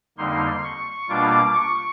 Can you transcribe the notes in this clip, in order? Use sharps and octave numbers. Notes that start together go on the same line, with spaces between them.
F2 D3 G3 A#3 D#4 C6
C#6
B2 G3 A#3 D4 F4 D6
C#6